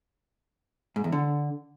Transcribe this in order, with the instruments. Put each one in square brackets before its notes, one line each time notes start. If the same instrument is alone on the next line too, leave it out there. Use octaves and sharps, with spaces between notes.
[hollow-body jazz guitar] G#2
E2
D3